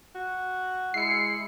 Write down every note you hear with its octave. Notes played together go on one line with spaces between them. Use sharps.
F#4
G#3 E4 C7 C#7